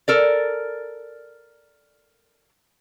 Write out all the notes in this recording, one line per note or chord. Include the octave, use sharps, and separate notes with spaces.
A4 A#4 D5